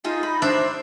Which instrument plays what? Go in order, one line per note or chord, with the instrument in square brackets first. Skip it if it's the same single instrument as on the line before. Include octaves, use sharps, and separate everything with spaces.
[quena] D#4 [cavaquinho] F4 G#4 A4
[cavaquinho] B5
[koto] D4 [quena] C5 [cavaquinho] E5